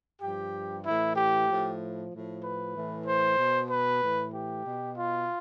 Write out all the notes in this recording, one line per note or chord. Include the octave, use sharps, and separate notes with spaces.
G2 F3 G4
A2 E3 E4
G4
A2 F3
A2 F3
B4
A2 E3
C5
B2
B4
A2 E3
G4
B2
F4